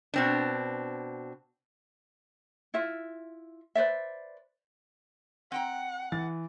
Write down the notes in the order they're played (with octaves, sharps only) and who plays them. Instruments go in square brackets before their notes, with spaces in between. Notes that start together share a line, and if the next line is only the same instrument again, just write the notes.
[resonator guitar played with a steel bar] B2 C4 D4
[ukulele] E4 F4 E5
B4 C5 D5 E5
[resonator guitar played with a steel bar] C4 G5 A#5 [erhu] F#5
[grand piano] E3 A6